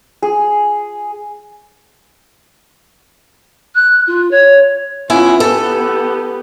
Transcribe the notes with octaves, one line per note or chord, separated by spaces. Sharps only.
G#4
F#6
F4
C#5
B3 C#4 E4 F4 G#5
B3 G4 A4